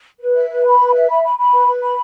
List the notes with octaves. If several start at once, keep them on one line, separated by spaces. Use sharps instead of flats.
B4
E5
B4
B5
B4
E5
B5
B5
B5
B4
B4
B5